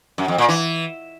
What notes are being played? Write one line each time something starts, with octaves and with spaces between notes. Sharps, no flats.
F#2
F2
A#2
E3